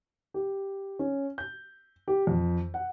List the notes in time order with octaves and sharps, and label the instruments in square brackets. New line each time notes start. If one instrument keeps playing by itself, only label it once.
[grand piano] G4
C#4
G6
G4
F2
F#5